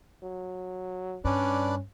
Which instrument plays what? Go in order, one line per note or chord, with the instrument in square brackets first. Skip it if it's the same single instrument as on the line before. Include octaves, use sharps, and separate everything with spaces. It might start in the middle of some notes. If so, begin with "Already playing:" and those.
[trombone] F#3
[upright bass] G2 [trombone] C#4 [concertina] D4 B4 D5